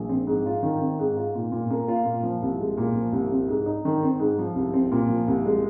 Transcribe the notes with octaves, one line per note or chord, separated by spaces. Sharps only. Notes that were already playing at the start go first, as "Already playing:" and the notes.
Already playing: A#1
C4
G#2
F4
D#3
C4
G#2
F4
A#2
A#2
A#3
F4
A#2
F3
C2
G#3
A#2
F3
C2
C4
G#2
D#4
D#3
C4
G#2
F3
C2
C4
A#2
F3
C2
G#3